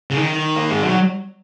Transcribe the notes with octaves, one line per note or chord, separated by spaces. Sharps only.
C#3
D#3
A#3
G#3
F#3